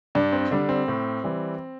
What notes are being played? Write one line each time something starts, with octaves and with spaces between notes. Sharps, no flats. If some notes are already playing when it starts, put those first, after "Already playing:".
G2 D4
C4
D3 G3 D4
C4
A2
E3 G3